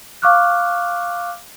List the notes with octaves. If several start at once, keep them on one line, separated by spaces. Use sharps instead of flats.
F5 C#6 D6 F6 F#6